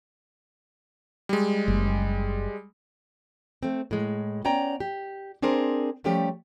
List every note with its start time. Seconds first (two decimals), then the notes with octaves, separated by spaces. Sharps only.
1.29 G3 G#3
1.68 F#1
3.63 A3 C4
3.91 A2 G#3
4.45 B3 C#4 D5 G5 A#5
4.80 G4
5.42 C4 D4 G#4 A#4 C5
6.04 F3 G3 A3 C#4 G4